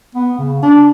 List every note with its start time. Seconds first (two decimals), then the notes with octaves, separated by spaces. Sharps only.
0.15 B3
0.38 C#3
0.62 D4